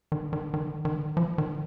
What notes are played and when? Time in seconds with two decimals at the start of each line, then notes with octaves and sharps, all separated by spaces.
0.12 D#3
0.33 D#3
0.54 D#3
0.85 D#3
1.17 F3
1.38 D#3